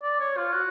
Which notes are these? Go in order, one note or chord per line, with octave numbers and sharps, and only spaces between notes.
D5
C#5
F4
F#4